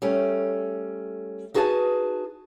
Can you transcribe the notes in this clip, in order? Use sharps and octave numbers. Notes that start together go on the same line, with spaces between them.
G3 A3 C#4
D#4 F#4 G#4 B4 E5 A5